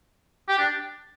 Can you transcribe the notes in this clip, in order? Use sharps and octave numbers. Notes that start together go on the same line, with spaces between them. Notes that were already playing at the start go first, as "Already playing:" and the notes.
G4
D4